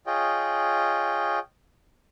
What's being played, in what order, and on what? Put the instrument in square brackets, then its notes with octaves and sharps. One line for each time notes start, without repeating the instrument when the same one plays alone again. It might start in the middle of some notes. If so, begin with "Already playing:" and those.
[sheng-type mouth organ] F4 G#4 C#5 D#5 G5